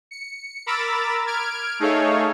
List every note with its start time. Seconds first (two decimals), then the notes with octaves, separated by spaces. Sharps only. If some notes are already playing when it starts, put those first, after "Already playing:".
0.11 C#7
0.66 A#4 A#5 B5 D6 E6 A6
1.27 F6 G#6 D7
1.79 A3 D#4 G#4 A4 C#5 F5